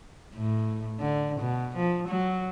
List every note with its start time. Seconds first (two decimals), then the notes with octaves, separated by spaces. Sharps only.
0.35 A2
1.00 D3
1.40 B2
1.77 F3
2.08 F#3